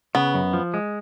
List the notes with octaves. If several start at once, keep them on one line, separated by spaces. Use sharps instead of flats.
C#3 B3
F#2
F3
G#3